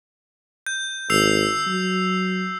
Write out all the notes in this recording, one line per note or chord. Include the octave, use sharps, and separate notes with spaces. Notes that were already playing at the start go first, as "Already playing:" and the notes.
G6
G#1 E6 C7 F7
F#3